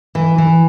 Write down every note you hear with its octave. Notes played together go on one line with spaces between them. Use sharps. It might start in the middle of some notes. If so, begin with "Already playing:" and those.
E3
E3